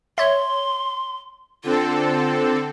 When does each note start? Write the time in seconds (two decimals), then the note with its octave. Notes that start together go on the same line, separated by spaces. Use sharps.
0.18 C#5 E5 C6
1.64 D3 C4 F4 A4